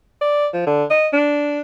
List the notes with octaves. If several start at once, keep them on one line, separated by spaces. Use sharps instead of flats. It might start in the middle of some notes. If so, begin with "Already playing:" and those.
D5
F3
D3
D#5
D4